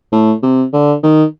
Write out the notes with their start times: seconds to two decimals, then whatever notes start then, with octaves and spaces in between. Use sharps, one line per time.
0.12 A2
0.43 C3
0.73 D3
1.03 D#3